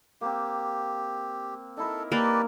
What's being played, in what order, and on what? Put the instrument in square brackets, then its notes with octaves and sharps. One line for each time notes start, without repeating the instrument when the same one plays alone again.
[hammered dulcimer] A#3 C4 [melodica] G4
[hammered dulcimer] D#4 E4 A#4 [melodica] A4
[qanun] A#3 [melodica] G4 B4 D5 [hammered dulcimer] A5